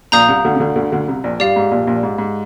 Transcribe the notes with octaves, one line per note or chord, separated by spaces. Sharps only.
A#1 A#2 F5 A#5 D#6 G6
C2 C3
D2 D3
C3
D2 D3
D2 D3
D2 D3
C2 C3
A#1 A#2
G2 G4 D5 F5
G#2
A#1 A#2
A#1 A#2
G#2
G#2